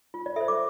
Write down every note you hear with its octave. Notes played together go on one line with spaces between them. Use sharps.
F4
D5
A4 C5 E5
D6